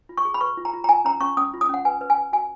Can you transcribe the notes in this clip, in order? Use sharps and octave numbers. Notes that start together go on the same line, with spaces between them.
F4
C#6
G#4
B5
B4 C#6
F4
A#5
F4
A#5
F4 G#5
C#4 A#5
C#4 C#6
C#4 D#6
F4
D#6
C#4 F#5
B4 G#5
B4
G#5
B4
F#4 G#5